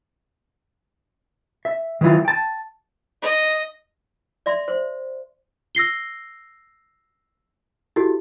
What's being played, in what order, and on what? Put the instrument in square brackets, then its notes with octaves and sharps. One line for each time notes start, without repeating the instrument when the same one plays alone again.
[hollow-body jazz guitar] E5
D#3 F#3 B3 E4 F4
G5 A5
[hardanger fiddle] D#5
[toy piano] D5 E5 C6
C5
[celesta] E6 A#6 C7 G7
E4 F#4 G4 A4